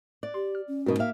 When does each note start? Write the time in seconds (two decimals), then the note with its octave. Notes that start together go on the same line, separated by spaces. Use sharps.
0.23 D5 F#6
0.34 G4 C6
0.55 F6
0.68 C#4
0.86 G#2 B2 F#4 A#4 D#5
0.98 A#3 E5 F5